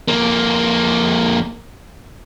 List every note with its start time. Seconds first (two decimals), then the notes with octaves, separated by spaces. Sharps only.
0.08 F2 A#3